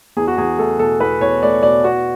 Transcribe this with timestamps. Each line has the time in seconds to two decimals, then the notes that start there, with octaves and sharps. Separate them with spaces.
0.17 E2 G#4
0.27 F#4
0.38 E2 G#4
0.58 A3 A4
0.79 B2 A4
1.00 E2 B4
1.21 E2 C#5
1.42 A3 D5
1.63 B2 D5
1.84 B3 F#4